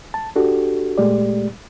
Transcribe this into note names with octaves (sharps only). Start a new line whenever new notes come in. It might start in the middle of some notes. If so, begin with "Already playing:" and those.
A5
D4 F#4 G4 A4
A#2 G#3 A3 G4 D5